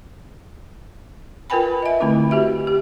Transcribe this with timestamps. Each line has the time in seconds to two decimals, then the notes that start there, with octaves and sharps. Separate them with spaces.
1.50 F4 A#4 B4 G5 G#5 B5
1.82 D#5 E5
2.00 D3 A3 C4 E4
2.31 F#4 G4 E5
2.67 G4